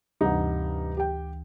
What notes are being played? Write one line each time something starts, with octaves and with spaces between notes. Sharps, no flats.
D2 G2 C3 E3 D#4 F#5
G4 G5